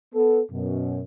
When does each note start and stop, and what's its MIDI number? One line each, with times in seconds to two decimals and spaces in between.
0.15 0.40 59
0.15 0.40 69
0.51 1.01 42
0.51 1.01 47